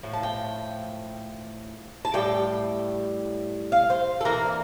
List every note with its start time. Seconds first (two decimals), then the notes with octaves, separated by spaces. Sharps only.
0.03 A2 F3
0.13 A5
0.23 G5
2.05 A5
2.14 A2 G3 G5
3.72 F5
3.90 C5
4.21 A4
4.25 E3 A#3 D4 A#4